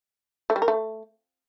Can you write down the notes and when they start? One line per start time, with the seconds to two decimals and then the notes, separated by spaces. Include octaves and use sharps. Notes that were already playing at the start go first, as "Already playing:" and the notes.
0.50 A3
0.56 G3
0.62 A#4
0.68 A3